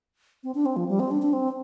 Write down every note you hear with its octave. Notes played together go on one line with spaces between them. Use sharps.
C4
D4
C4
F3
G3
C4
D4
D4
C4